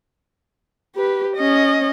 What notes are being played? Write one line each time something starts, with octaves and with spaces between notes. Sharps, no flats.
G4 B4
C#4 D#5